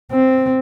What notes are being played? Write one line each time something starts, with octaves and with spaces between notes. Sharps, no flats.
C4